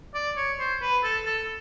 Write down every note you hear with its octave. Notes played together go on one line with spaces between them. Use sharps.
D5
C#5
C5
B4
A4
A4